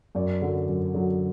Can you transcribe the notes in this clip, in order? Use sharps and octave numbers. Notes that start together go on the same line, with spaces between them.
F#2 D5
D3 F#3
F#2
D3 F#3